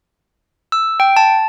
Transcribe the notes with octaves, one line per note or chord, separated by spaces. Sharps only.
E6
G5
A5